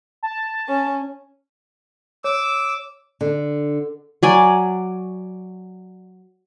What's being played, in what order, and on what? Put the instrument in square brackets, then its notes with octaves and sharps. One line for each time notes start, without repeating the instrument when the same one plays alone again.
[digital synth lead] A5
[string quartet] C#4
[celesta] C#5 [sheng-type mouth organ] D6 E6
[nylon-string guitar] D3
[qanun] F#3 D5 G#5